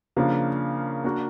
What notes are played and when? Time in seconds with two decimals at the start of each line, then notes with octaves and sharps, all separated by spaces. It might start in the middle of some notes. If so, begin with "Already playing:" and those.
0.17 C#3 F3 A#3 D4 F4
1.04 A#3 D4 F#4